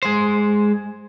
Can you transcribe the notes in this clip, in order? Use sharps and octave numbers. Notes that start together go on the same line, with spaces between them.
G#3 C5